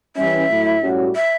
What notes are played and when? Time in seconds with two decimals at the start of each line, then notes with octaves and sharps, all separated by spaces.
0.17 E3 G3 C#4 E5
0.49 A2 F#3 A3 E4
0.83 A2 G3 C#4 F#4
1.16 E5